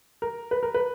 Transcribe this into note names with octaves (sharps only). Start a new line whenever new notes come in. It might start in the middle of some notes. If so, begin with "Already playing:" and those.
A#4
B4
A#4
B4